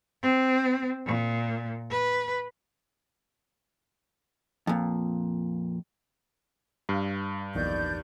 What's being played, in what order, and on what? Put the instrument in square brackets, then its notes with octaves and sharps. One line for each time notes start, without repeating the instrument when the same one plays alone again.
[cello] C4
A#2
B4
[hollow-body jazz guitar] F2 A#2
[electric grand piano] G2 [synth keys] F5
[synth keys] A#1 E2 D#3 [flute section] D5 G6